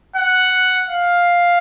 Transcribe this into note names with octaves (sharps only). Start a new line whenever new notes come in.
F#5
F5